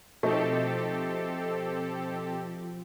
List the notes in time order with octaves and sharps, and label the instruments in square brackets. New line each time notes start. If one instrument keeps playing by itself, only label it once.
[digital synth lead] B2 [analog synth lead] F3 [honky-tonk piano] A3 D#4 [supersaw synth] C4 G4 A4